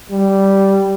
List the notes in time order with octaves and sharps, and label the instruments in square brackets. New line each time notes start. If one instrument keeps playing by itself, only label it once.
[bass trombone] G3